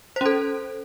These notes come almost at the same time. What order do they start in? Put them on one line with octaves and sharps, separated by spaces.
C5 C#4 A4